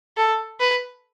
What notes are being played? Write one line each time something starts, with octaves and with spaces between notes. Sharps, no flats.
A4
B4